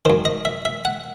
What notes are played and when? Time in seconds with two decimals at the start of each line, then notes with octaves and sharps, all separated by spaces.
0.05 F#2 D#3 C5
0.25 D#5
0.45 E5
0.65 E5
0.85 F#5